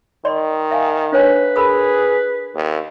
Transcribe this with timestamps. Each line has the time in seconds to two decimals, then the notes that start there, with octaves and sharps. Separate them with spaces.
0.25 D#3 D5 D#5 C6
0.71 E5 F5 G#5
1.12 D4 B4 C#5 G#5
1.56 G#4 A#4 B5 D#6
2.55 D#2